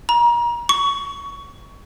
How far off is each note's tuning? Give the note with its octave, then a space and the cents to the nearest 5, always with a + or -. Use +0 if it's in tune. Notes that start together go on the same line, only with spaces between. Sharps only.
A#5 +35
C#6 +20